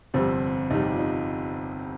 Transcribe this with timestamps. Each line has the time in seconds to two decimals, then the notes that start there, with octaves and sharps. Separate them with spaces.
0.14 G1 F2 C3 G3 C4
0.70 G1 F2 C3 G3 D#4
0.81 G4
0.90 F4
0.99 D#4